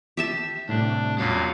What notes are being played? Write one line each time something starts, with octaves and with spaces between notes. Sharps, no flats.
G4 E5 A5
C2 A2 D4
E2 A#2 F#3 C#4 F5